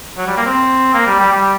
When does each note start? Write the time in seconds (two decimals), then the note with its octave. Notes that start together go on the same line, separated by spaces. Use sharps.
0.18 F#3
0.28 G3
0.37 A#3
0.46 C4
0.94 A#3
1.07 G3
1.20 G3
1.32 G3